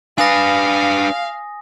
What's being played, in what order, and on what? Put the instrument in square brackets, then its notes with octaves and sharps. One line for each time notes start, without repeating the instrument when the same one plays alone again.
[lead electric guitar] D4 B4 [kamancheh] F5 [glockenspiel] G#5 D#6 A#6